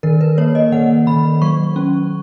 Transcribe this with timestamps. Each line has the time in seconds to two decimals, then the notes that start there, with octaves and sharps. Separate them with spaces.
0.03 D#3 A#4
0.21 B4
0.38 A#3 C#5
0.55 D#5
0.72 D#3 F#5
1.07 D#3 B5
1.42 F#3 C#6
1.76 C#4